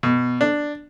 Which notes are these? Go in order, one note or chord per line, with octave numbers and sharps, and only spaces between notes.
B2
D4